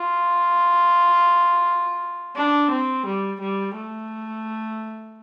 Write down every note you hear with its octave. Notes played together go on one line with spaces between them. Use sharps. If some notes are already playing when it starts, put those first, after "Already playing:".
Already playing: F4
D4
C4
G3
G3
A3